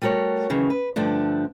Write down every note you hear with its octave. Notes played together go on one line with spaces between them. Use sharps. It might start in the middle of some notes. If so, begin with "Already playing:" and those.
G3 A3 F#4 A#4 C#5
D#2 C#3 E3 F#3
B4
G2 D3 F3 A3 D4